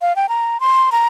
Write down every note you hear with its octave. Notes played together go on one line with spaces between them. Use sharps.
F5
G5
A#5
C6
A#5